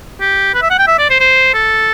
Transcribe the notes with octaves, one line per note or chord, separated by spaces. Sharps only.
G4
B4
E5
F#5
G5
E5
D5
C5
C5
A4